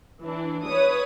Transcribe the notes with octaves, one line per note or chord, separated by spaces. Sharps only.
E3 D4
B4 C#5 D#6